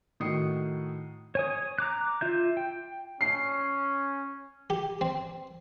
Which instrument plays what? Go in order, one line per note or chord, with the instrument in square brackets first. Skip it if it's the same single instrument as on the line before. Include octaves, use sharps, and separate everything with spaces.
[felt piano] A2 D#3 F#4 D#6 C7 C#7
[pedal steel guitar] C#5 G#5 D#6
A#5 D6 F#6
F4 E5 G6
G5
[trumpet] C#4 [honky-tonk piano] C7
[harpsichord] G4
C4